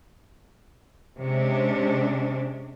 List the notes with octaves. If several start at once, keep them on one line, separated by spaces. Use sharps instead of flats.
C3 G#3 C#4 D4